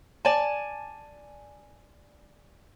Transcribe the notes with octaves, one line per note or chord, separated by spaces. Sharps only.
D5 G#5 A5